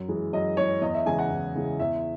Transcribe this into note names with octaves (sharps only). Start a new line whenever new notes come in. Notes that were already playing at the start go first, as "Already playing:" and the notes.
Already playing: F#2
E3 G#3
F#2 D#5
E3 G#3 C#5
E2 D#5
E5
C#3 E3 G#3 G#5
F#5
E2
C#3 E3 G#3
E2 E5